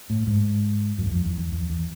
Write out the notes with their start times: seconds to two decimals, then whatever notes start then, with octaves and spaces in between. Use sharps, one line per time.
0.10 A2
0.27 G#2
0.98 F#2
1.06 E2
1.11 F2
1.25 E2
1.38 E2
1.52 E2
1.70 E2